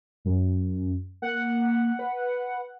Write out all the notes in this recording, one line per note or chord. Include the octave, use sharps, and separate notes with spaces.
F#2
A#3 F#5
B4